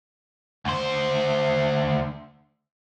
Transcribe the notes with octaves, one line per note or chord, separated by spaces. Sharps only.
D2 C5